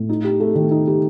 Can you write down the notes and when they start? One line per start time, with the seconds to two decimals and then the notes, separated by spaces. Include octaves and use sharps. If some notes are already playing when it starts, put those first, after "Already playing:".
Already playing: A2
0.09 D#4
0.24 G4
0.40 A3
0.55 D#3
0.71 D#4
0.87 G4